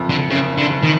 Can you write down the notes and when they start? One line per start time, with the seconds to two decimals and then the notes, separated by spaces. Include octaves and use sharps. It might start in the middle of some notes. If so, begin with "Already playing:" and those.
Already playing: F#1 F2
0.10 D3
0.30 F#1 C#3
0.58 D3
0.70 F#1
0.83 D#3